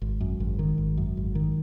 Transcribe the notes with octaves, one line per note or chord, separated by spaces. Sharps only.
G#1
F#2
G#1
D#3
G#1
F#2
G#1
D#3